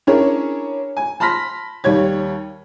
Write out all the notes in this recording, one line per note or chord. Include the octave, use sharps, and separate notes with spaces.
C#4 D4 E4 G#4 A#4 C#5
G#5
A5 B5 C6 F6 A#6 B6
D#2 G3 C#5 G#6